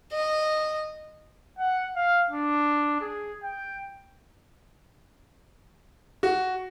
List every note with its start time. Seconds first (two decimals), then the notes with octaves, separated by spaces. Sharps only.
0.12 D#5
1.59 F#5
1.96 F5
2.30 D4
3.01 G#4
3.43 G5
6.23 F#4